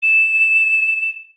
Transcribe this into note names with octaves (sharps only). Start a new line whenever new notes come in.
E7